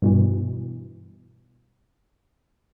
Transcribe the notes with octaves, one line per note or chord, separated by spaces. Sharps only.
G2 B2 E3